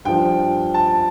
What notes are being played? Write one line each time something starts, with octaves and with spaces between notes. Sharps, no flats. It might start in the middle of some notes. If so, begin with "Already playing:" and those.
G2 F3 G5
A5